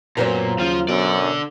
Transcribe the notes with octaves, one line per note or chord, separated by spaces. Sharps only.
F#2 A#2 F#3 B3 A#4 C5 A#5
D#2 C#3 F3 F4
F#2 B2 D3 D5